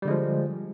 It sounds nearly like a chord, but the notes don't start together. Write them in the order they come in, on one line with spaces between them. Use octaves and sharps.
G3 D3 G#3 F3